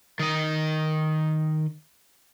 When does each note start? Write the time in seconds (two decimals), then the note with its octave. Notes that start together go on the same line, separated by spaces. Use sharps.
0.19 D#3 D#5